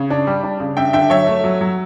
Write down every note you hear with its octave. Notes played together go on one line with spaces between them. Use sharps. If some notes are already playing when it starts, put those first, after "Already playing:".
Already playing: C#3
D4
G3
D4
C#3
G2 E5 G5
D3 E5 G5
F#3 C#5 E5
A3
F#3
F#3